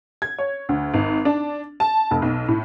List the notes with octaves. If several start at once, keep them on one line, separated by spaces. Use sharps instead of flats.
G#6
C#5
D2
G#1
D4
A5
F1
B1
A2